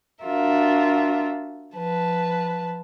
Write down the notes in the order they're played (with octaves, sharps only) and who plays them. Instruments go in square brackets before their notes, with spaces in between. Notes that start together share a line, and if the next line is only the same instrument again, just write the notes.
[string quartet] D4 F4 F#4 A#4 E5
F3 B4 A5